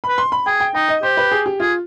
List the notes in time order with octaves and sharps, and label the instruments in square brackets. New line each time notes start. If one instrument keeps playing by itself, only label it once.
[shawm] B4 [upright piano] B5
[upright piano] C6
B5
[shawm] G#4 [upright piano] G5
[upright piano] G5
[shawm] D#4 [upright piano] G5
[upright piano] D#5
[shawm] G4 [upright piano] C5
[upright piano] B4
G#4
G4
[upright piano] F4 [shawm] G#4